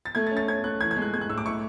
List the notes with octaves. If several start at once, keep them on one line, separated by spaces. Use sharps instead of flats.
A6
A3 G#6
A6
C#4
A6
C#4 G#6
A3 F#6
E3 G#6
G#6
G#3
F#6
G#3 G#6
F#6
A2 E6
D6
E4 C#6